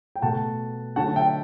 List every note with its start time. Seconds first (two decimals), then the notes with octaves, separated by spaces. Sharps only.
0.16 G5
0.22 B2 A3 F#5 A5
0.96 D3 F#3 A3 F#5 A5
1.15 E5 G5